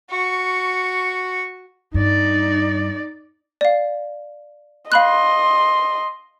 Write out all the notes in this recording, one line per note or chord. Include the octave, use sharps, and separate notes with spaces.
F#4 C#6
G2 D#4 D5
D5 F5
D#5 F5 B5 C6 F#6